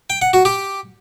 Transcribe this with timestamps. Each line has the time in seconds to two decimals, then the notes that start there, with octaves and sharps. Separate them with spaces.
0.10 G5
0.22 F#5
0.33 F#4
0.45 G4